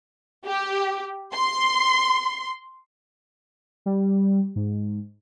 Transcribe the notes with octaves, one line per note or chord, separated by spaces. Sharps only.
G4
C6
G3
G#2